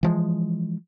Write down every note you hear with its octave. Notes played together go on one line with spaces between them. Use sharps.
E3 F3 G#3